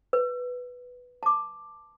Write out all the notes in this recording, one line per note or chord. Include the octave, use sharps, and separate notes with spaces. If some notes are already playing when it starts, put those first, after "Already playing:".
B4
A5 D6